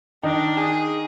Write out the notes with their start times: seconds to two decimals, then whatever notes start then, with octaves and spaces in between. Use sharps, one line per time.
0.23 D#3 D4 D#4
0.58 G#4